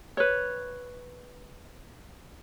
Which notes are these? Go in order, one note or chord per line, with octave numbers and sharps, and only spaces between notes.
B4 C#5